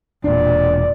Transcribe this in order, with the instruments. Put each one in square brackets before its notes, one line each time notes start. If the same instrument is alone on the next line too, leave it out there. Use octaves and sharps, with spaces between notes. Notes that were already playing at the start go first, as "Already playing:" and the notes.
[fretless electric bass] E1 D4 [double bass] A#2 [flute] D5